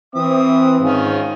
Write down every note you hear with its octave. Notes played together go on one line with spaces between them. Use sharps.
E3 C4 E5 D#6
G#2 D#3 C#4 F4